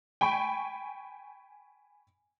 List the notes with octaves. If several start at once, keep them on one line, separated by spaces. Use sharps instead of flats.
G5 G#5 B5 C#6